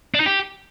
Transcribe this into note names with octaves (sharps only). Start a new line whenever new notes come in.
D4
D#4
G4